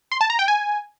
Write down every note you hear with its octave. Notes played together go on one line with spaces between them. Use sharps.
C6
A5
A#5
G5
G#5